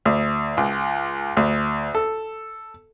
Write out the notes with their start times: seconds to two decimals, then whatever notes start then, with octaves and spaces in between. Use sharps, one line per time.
0.05 D2
0.57 C#2
1.37 D2
1.95 A4